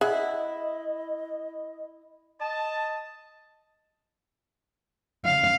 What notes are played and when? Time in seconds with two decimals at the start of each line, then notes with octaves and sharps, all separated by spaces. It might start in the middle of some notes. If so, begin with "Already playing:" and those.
0.01 E4 G#4 D#5 E5 F#5
2.40 D#5 A5
5.25 F5